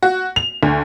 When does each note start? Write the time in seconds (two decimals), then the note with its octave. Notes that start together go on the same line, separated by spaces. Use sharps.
0.02 F#4
0.36 F7
0.63 D2